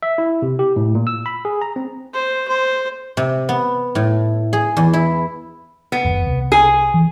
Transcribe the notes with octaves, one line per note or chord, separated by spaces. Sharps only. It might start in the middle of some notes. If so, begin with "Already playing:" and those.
E5
E4
C3
G4
A2
A#2
E6
B5
G#4
A#5
C4
C5
C5
C3
B3
A2
G#4
E2
E4
B3
F#1 D#2
C2
G#4
E3